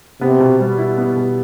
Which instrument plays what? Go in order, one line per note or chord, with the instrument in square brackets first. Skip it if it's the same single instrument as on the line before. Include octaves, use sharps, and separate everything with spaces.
[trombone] C3 [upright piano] B3
[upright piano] B2
G3
E4
B3
B2